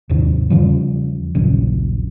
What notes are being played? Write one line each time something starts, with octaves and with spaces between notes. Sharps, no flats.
D#2 G#2 C3
E2 C#3 F3 G3
D#1 A#1 F#2 C#3